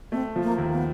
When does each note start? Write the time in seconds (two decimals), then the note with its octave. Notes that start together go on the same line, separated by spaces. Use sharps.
0.12 A3 C4
0.36 F3
0.43 A#3
0.58 D#2
0.73 B3